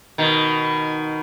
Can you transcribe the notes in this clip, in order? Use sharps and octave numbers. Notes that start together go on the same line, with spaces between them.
B2 D#3